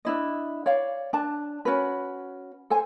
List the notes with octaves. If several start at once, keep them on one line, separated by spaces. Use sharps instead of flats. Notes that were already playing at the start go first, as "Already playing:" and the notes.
D4 E4 D#5
C#5 D5 F5
D4 A5
C#4 F#4 B4
A4 C5 G#5